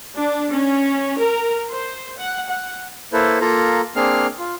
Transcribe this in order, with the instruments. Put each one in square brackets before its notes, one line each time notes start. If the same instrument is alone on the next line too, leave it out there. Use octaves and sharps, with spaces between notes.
[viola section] D4
C#4
A#4
C5
F#5
F#5
[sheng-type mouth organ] A#3 E4 A4 B4 C5
A#3 F4 A4 A#5
A#3 C4 D4 G#4 F5 F6
F4